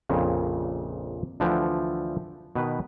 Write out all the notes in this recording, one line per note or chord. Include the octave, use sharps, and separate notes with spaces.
A#1 F2 A#2 C#3
D2 D3 E3 F3 F#5 G5
B2 D#3 B4